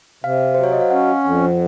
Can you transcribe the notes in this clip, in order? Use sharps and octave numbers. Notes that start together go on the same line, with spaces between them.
C3 F5
F#3 C5
C#5
D#5
F5
C#4 F#5
F2